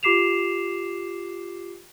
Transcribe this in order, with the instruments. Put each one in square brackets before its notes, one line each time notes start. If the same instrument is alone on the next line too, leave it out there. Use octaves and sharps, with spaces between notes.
[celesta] F4 G4 D6 C7 E7 F7